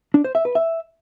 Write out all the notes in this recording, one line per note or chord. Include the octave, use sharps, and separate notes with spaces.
D4
C5
E5
B4
E5